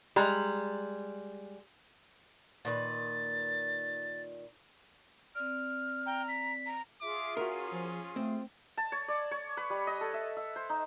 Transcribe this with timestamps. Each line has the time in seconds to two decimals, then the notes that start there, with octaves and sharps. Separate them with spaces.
0.16 G3 G#3 A#5
2.65 A#2 D#3 B4 A6
5.35 C4 D5 F6
6.06 G5 A#5
6.28 B6
6.66 A#5
7.01 F4 G#4 E5 D6
7.37 C#4 F#4 A#4
7.72 F3
8.16 A3 C4
8.77 A5
8.92 C#5
9.08 D5
9.31 C#5
9.57 B4
9.70 G3
9.87 D#5
10.01 A4
10.14 E5
10.37 E5
10.56 C5
10.70 D#4